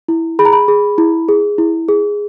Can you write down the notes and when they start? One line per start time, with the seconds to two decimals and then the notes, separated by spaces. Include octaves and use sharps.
0.08 E4
0.39 G#4 B5
0.45 A#5
0.53 B5
0.68 G#4
0.98 E4
1.29 G#4
1.58 E4
1.88 G#4